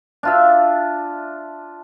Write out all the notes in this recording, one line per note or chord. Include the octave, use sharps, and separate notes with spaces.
D4 F4 E5